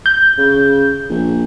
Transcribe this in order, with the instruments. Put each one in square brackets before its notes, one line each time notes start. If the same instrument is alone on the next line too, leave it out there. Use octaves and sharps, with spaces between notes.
[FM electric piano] G6
[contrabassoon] C#3
A#1